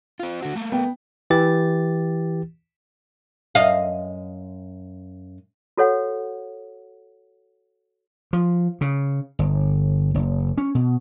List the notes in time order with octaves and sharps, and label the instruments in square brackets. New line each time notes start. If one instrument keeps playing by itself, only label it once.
[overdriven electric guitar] C4 F4
D3 F#4
A3 A#3
[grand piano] B3 G5
[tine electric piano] E3 G4 A6
[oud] F#2 D#5 F5
[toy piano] F#4 A4 C#5 F#5
[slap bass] F3
C#3
G1
F#1
C#4
B2